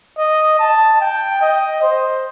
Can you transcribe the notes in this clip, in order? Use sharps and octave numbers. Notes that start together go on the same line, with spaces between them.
D#5
A5
G5
D#5
C5